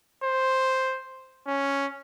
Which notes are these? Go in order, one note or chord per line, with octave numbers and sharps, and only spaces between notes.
C5
C#4